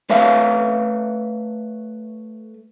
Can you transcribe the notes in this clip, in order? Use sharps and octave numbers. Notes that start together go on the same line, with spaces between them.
A3 B4 C#5 E5 F5